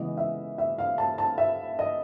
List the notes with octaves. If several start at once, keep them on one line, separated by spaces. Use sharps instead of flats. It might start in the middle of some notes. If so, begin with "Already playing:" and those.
Already playing: C#3 E3 G#3 B3 D#5
E5
E5
F5
A5
A5
E5
D#5